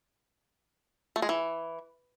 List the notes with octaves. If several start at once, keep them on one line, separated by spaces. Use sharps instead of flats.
A3
G#3
E3